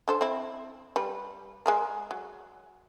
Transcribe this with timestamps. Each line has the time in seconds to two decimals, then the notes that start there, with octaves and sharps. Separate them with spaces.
0.08 D3 A4 C5
0.21 C4 E4
0.96 G3 B4
1.66 G#3 G#4 A#4
2.11 F#3